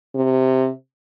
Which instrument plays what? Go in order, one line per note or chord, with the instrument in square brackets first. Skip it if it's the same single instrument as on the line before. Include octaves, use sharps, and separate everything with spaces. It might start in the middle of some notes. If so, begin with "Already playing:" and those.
[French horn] C3